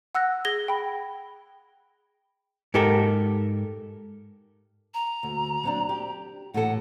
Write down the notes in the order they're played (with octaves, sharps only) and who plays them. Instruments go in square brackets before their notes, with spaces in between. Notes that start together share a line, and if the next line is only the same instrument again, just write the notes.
[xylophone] F#5 E6 F#6 A#6
G#4 G#6 A#6 G7
G5 B5
[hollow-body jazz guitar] G#2 G4 A4 A#4
[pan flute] A#5
[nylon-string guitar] D2
F#3 C4 D4
G4
[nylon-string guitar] A2 E3 A4 [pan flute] F#5